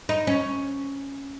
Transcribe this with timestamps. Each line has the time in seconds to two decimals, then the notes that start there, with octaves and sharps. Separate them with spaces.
0.09 D#4
0.27 C#4